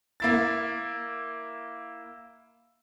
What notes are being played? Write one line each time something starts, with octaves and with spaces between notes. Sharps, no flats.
A#3 E4 A6